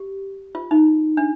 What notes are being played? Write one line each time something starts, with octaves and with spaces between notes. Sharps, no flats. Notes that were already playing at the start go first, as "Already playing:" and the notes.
Already playing: G4
F4
D#4
D4